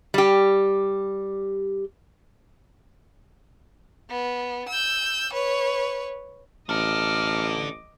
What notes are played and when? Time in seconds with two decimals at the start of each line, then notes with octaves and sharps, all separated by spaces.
0.14 G3 G4
4.10 B3
4.69 E6 G6
5.33 B4 C#5
6.69 A1 D4 A4 D#5 D6 F6